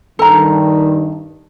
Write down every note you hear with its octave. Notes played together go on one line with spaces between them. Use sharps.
G2 D#3 A4 A#5